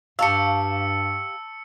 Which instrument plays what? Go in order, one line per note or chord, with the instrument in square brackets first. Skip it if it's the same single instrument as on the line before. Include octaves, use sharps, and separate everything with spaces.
[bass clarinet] G2 [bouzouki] G4 F5 [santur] A5 C#6 [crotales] E6 C#7